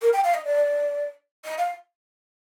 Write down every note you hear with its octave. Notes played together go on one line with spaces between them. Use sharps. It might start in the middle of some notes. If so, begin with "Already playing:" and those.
A#4
G5
F5
D#5
D5
D#5
F5